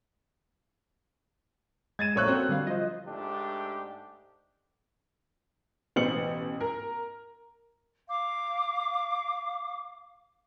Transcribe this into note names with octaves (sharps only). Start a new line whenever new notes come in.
G#3 G#6 A6 D#7 E7
A#1 A#3 A4 A#4 C#5 F#6
C4 F#4
D3 G3 F5
F3 C5 D#5
G#2 A3 D4 G4
A1 B2 B3 C5 C#7 F#7
A#4
F5 D6